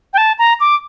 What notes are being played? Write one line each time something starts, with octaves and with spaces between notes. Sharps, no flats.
G5
A5
A#5
D6